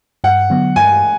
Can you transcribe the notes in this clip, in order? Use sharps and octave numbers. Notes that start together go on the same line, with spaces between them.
G2 F#5
D3 F#3 B3
G2 G#5